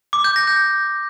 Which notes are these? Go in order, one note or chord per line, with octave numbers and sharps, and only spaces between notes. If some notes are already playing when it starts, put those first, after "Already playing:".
D6
G6
A#6
G6